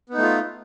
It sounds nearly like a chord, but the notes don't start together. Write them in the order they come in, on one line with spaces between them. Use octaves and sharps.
B3 D#4 A3 F4